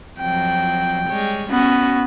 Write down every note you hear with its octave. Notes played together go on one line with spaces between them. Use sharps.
F2 F3 F#3 G5
G3 G#3 C#5
B3 C#4 F#4